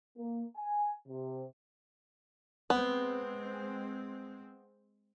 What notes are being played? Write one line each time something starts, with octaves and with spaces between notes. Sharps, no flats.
A#3
G#5
C3
G#3 B3 C4